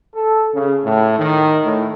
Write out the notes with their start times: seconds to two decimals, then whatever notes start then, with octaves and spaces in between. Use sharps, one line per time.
0.14 A4
0.53 C#3
0.84 A2
1.18 D#3
1.64 A2